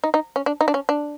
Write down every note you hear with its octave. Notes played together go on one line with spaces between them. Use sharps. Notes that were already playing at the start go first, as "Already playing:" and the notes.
D#4
D#4
C#4
D4
D#4
D4
C#4
D4